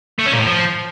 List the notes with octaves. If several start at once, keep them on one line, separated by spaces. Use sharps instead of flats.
A3
C#4
A#2
A2
F3